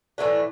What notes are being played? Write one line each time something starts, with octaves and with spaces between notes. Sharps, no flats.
A2 E3 A3 D4